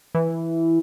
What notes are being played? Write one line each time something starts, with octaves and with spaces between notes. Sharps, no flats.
E3